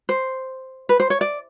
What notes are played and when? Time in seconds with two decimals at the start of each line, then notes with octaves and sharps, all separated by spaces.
0.09 C5
0.89 B4
1.00 C5
1.10 C#5
1.21 D5